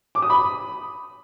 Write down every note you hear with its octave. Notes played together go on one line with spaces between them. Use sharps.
D6
D#6
B5